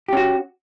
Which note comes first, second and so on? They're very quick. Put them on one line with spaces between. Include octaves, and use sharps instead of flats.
G4 C#4 F#4